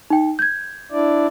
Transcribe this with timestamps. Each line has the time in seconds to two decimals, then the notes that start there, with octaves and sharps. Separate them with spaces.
0.10 D#4 G5
0.39 G6 G#6
0.92 D4 E4 D5